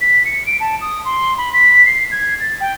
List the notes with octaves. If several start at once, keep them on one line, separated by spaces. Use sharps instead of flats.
B6
C#7
D7
A5
D#6
C6
B5
B6
C7
G#6
A6
G5